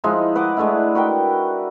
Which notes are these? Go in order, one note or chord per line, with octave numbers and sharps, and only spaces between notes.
F3 G#3 D#4 E4
B4 D#5 F#5 D6
G#3 A3 D4 E4
F#4 A#4 B4 G5